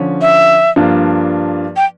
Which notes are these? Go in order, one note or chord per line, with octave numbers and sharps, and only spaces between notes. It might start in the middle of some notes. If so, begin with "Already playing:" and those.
Already playing: D3 F3 C#4
E5
G2 F3 A#3 D4 F4
G5